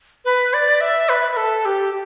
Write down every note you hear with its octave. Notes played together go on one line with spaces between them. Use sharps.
B4
D5
E5
B4
B4
A4
G4